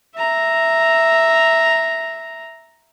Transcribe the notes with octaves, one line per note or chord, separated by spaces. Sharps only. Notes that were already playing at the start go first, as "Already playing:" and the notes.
E5 A#5